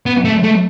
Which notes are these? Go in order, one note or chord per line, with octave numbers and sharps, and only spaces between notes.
B3
A3
A3